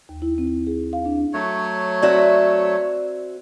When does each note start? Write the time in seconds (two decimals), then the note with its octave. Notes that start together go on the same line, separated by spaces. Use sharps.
0.09 D#2
0.22 E4
0.38 C4
0.67 G#4
0.93 F5
1.05 D4
1.34 F#3 A3 C#5
2.02 C4 F#4 D5 E5